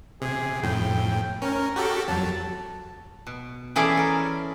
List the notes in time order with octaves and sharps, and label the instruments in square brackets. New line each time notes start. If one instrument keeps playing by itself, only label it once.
[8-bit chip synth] C3 [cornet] G#4
[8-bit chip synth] F2 A2 [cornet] G5
[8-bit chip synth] C#4 [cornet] A#4
[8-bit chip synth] F#4 G4 A4
[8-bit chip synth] F2 F#3 [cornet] A5
[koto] B2
E3 C#4 G#4 A4 D5 E5
A4 A#4